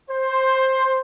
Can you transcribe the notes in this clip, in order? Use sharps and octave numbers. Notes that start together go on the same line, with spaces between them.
C5